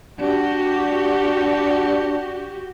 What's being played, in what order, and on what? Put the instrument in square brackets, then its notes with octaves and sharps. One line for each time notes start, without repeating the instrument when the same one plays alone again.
[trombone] D4 [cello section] F#4 G4